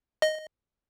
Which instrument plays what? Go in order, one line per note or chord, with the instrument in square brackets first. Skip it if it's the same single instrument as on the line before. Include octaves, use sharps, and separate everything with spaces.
[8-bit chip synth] D#5